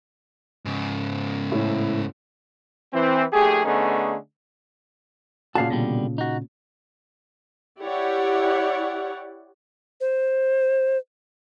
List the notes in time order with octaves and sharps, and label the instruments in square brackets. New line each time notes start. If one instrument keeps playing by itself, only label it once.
[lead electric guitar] G#2 C#3
[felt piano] A2 E4
[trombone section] E3 C4
A#1 A3 G4 G#4
D3 A3 B3 C#4 D#4 G#4
[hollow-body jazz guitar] A#2 C#3 A5 [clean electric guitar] F#4 F5
[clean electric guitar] B2 D3 G3
D#4 F#4
[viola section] E4 G4 C#5 D5 F#5
[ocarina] C5